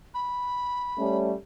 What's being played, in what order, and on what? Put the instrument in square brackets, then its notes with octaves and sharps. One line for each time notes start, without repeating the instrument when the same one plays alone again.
[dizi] B5
[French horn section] G3 A3 C#4